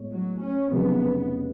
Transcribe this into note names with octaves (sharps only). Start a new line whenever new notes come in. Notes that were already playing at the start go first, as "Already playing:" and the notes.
Already playing: A2 G#3 B3 C#5
F#3
C#4
F1 F2 C#3 F#3 B3